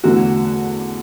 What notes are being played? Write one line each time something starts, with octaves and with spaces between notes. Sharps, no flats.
E2 D3 A3 F#4